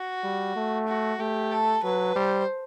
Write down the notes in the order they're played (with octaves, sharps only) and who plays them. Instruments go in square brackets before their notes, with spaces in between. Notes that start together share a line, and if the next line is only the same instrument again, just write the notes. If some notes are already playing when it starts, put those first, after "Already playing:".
Already playing: [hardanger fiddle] F#4
[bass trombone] G3
A3
[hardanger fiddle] F#4
[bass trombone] A3 [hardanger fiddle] G4
[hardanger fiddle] A4
[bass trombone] F#3 [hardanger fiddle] B4
[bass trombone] G3 [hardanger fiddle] C5